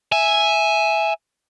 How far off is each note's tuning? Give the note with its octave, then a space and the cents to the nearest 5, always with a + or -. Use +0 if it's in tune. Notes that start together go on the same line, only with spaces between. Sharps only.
E5 +0 G#5 +5